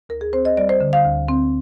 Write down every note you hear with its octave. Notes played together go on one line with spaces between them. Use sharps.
D2 A#4
G#4
C4 C5
D#5
G3 D5
C5
D3
F5
D2
C4